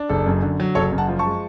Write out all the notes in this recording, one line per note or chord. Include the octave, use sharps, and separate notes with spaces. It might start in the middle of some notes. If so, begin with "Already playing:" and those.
Already playing: D4
F#1 A4
F#2
D3
F#3
F#1 A4 C#5
F#2
F#5 A5
F3
A5 C#6
G#3